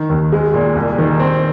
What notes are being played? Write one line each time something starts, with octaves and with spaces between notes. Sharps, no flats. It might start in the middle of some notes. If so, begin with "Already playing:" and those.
Already playing: D#3
D#2
G#3
A#2
C2
D#3
C4